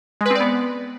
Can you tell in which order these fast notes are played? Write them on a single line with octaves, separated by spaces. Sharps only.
G#3 B4 C4 D5 B3